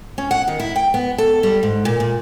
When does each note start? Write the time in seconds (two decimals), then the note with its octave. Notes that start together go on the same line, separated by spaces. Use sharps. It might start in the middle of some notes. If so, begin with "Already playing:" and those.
0.18 C#4
0.31 F#5
0.48 D#3
0.60 E4
0.76 G5
0.94 B3
1.18 A4
1.43 G3
1.63 G#2
1.85 A#2
2.00 A#2